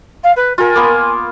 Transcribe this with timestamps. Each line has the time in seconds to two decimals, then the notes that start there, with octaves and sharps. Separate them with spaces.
0.23 F5
0.36 B4
0.58 F4 A#4 G#5
0.75 A#3 B3